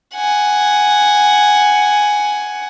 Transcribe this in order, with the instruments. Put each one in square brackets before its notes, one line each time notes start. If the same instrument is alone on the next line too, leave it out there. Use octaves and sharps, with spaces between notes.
[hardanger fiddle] F#5 G#5